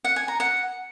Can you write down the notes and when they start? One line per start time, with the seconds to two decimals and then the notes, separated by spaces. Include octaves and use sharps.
0.04 F#5
0.16 G#5
0.28 A#5
0.40 F#5